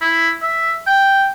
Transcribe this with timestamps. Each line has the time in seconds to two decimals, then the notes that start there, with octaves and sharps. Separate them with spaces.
0.01 E4
0.42 E5
0.87 G5